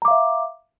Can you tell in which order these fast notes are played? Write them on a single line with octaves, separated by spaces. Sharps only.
A#5 D6 F5 E5